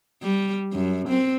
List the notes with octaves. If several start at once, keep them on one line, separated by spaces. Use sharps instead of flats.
G3
F#2
C4